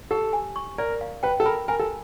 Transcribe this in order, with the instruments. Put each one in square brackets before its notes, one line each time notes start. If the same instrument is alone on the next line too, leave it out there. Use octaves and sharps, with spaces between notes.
[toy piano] G4 [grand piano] A4
[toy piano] G#5
C#6
[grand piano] A#4 [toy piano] D5
[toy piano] F5
[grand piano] B4 [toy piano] G5
[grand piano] A4
[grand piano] A#4 [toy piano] B5
[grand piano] A#4 [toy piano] G#5
[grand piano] A4